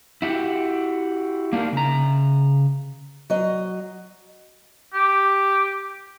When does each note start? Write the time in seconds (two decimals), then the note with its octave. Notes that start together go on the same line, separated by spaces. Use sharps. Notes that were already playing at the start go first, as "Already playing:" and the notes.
0.22 E4 F#4 G4
1.53 A#3 D4 D#4 A#4
1.73 C#3 A#5
3.30 F#3 D#5
4.94 G4